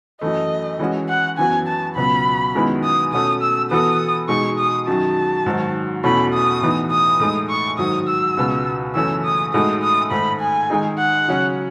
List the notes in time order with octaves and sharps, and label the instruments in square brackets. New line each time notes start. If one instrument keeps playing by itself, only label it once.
[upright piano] F#2 E3 A3 [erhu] D#5
[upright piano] E3 G#3 C#4 F#4
[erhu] F#5
[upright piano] F#2 E3 B3 F#4 [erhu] G#5
[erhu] A5
[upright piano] C#2 B2 F#3 B3 [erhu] B5
[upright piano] F#2 D#3 G#3 B3 E4
[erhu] D#6
[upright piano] B2 A3 C#4 F#4 A4 [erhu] D#6
[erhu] E6
[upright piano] E3 B3 F#4 A4 [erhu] D#6
[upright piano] B2 G#3 D#4 G#4 [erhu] C#6
[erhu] D#6
[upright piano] F#2 D#3 F#3 [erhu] A5
[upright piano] G#2 D#3 F#3
[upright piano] E2 B2 A3 C#4 E4 [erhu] B5
[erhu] D#6
[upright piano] A2 E3 B3 D#4
[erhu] D#6
[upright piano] A2 G#3 D#4 A4
[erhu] C#6
[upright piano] G#2 D#3 F#3 [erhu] D#6
[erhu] E6
[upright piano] C#2 B2 G#3 B3
[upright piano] F#2 C#3 E3 A3 C#4 [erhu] E6
[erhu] D#6
[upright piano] A2 G#3 D#4 F#4 A4 [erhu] D#6
[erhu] D#6
[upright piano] G#2 D#3 A3 [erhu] B5
[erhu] G#5
[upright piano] D#3 G#3 D#4 G#4
[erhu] F#5
[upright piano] C#3 F#3 C#4